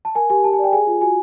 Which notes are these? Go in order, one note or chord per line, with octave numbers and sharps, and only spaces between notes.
A5
A#4 G#5
G4 G#5
G4 A5
G#5
D5 G5
G#4 G#5
F4
F#4 G#5